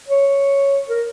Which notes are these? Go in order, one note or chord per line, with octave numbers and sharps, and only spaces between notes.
C#5
A#4